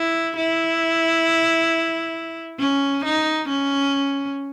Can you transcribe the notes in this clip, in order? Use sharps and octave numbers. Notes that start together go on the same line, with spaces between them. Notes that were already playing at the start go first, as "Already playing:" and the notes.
Already playing: E4
E4
C#4
D#4
C#4